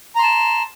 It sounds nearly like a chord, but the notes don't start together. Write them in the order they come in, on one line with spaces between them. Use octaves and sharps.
A#5 C6 A5